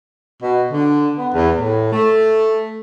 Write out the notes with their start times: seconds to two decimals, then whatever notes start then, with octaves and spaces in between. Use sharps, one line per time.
0.43 B2
0.72 D3
1.18 B3
1.34 E2
1.59 A2
1.93 A3